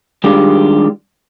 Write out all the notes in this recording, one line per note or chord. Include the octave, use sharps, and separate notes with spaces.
D#3 G3 G#3 D4 F4 G4